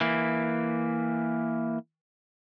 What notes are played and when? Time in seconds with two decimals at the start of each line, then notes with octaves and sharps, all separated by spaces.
0.01 E3 A#3